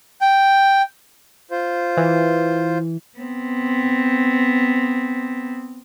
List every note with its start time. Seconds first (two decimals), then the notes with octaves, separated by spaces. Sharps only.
0.21 G5
1.51 F4 C5
1.97 E3
3.18 B3 C4